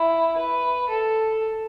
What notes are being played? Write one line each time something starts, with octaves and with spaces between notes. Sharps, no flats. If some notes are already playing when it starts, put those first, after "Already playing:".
Already playing: E4
B4
A4